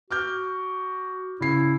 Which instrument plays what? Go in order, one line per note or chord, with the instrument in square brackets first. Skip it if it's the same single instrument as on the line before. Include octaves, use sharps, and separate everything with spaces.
[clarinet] F#4 [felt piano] D6 F6 G6
[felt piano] C#3 C7 [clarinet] E4